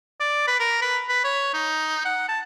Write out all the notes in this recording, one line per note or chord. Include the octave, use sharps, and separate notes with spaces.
D5
B4
A#4
B4
B4
C#5
D#4
F#5
A5